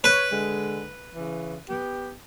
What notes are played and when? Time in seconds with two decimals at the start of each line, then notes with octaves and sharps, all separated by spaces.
0.04 B4 C#5
0.30 D3 G#3
1.16 C#3 E3
1.69 B3 G4